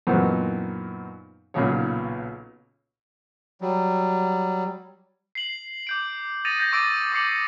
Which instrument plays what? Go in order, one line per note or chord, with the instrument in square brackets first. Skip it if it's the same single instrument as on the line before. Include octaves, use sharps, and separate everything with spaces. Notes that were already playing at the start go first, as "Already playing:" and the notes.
[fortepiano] F#2 A#2 E3 B3 C4 D#4
B1 A#2 C#3 G#4 C#5
[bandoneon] F#3 G3
[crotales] C7 F#7
D6 G6 D7
D#6 A6 A#6 C#7 D#7 F7
G6 A#6
C#6 D6 E6 A6 D7
D6 E6 C7 C#7 F#7